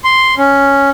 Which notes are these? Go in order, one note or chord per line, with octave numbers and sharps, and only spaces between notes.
C6
C#4